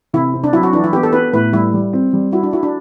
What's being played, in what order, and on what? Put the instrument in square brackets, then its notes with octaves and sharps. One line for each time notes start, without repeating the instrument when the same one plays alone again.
[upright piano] C3 [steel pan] E4
[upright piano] C4
[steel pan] D4
[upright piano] F#3 [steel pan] E4
[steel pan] F#4
[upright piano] E3 [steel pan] D4
[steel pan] E4
[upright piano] B3 [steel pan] G4
[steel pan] A4
[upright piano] B3 [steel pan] B4
[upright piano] A2 [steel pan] B4
[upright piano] G3 [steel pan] E4
[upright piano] G3
C4
G3
[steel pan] E4 [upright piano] F#4
[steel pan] D4
[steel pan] E4 [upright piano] F#4
[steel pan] D4